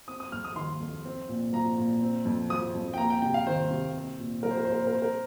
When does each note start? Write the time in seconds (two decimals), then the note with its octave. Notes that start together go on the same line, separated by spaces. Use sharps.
0.08 C4 D#6
0.20 D#6
0.32 F2 F6
0.45 D#6
0.56 D#3 C6
0.80 F2
1.05 C4
1.29 A#2
1.53 F3 A#5
1.78 A#2
2.01 C4
2.25 F2
2.49 F3 D#6
2.74 F2
2.94 G5
2.98 A#3 A#5
3.10 G5
3.22 C3 G5
3.34 F5
3.46 D#3 C5
3.70 C3
3.95 C4
4.19 A#2
4.43 F3 A#4
4.51 C5
4.57 A#4
4.65 A#2 C5
4.72 A#4
4.79 C5
4.87 A#4
4.92 C4 C5
5.02 A#4